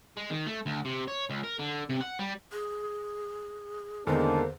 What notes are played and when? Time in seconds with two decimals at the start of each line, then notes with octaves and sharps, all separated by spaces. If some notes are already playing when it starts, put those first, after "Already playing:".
0.17 G#3
0.30 D#3
0.46 A3
0.66 D2
0.85 C3
1.08 C#5
1.30 C#2
1.43 A#4
1.59 D3
1.89 C3
2.01 F#5
2.19 G3
2.53 G#4
4.07 E2 D3 D#3 G#3 A#3 D4 C5